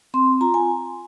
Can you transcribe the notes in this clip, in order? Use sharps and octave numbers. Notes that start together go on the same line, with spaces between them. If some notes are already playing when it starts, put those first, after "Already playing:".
C4 C6
F4 A#5
G#5